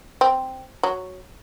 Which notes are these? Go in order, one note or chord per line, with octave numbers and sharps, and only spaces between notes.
C4
F#3